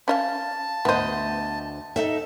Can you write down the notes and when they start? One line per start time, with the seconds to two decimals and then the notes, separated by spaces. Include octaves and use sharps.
0.08 C#4 D#5 F5 A5
0.85 D2 B3 C5 D#5
1.96 D#4 A4 E5